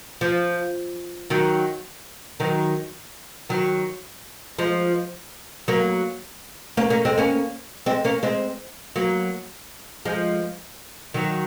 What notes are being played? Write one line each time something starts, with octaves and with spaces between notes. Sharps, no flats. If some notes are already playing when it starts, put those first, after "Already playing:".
F3
D#3 F#3
D#3 F#3
D#3 F#3
F3 G#3
F#3 A#3
A#3 C#4
A#3 C#4
G#3 C4
A#3 C#4
G#3 C4
A#3 C#4
G#3 C4
F#3 A#3
F3 G#3
D#3 F#3